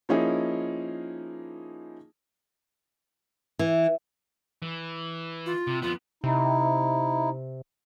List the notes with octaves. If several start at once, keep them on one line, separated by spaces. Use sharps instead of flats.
F3 A#3 C#4 D#4 E4 G#4
E3
E3
F4
C3
F2 B3 F4
C3 D#4 E4